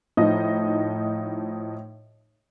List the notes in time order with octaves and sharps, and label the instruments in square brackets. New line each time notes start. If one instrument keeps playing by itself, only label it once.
[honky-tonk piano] A2 F3 D#4 D#5